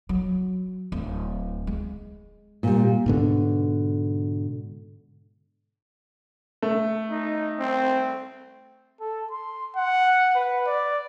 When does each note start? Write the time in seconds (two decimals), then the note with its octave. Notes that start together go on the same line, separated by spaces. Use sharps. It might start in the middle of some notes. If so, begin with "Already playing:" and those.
0.09 F#3
0.92 D1
1.67 G#3
2.63 A#2 G3
3.06 G#2 B2 D3
6.63 A3
7.10 D#4
7.60 C4
9.01 A4
9.31 C6
9.76 F#5
10.35 B4
10.66 D5